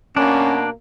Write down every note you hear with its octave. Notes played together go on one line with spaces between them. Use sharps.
B2 A#3 C#4 D4